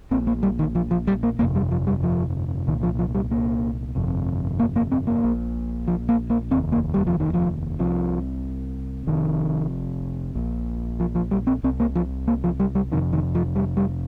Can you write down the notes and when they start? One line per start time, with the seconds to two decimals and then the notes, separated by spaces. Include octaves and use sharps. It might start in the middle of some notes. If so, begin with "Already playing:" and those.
0.11 A#1 A#2 C4
0.27 A#3
0.43 G3
0.59 D#3
0.75 F3
0.91 F3
1.07 G3
1.23 A#3
1.39 G1 F2 C3 A#3
1.55 G3
1.71 F3
1.87 G3
2.03 F3
2.67 C2 A#2 D#3
2.83 F3
2.99 F3
3.15 G3
3.31 A#3
3.95 G1 F2 C3
4.59 A#3
4.76 A#3
4.92 C4
5.07 A#3
5.23 A#1 A#2
5.88 F3
6.09 A#3
6.30 A#3
6.51 D#2 C4
6.55 F1
6.72 A#3
6.94 G3
7.07 F3
7.20 D#3
7.34 F3
7.79 C2 C3 F3
9.07 F1 F2 C3 D#3
10.35 A#1 A#2
11.00 F3
11.15 F3
11.31 G3
11.47 C4
11.63 C2 C3 C4
11.80 A#3
11.96 F3
12.28 A#3
12.44 F3
12.60 G3
12.75 G3
12.92 F1 F2 C3 D#3
13.13 D#3
13.35 F3
13.56 G3
13.77 G3